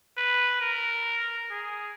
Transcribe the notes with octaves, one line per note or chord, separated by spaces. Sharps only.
B4
A#4
G#4